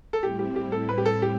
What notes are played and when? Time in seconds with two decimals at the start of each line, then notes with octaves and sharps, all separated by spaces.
0.13 A4
0.22 A2 G3 C4 E4 G4
0.39 G4
0.56 G4
0.72 A4
0.89 B4
0.98 G4
1.06 A4
1.22 G4